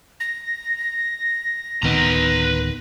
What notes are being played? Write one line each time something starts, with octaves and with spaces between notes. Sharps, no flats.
A#6
D1 D#3 B3 B4 A#5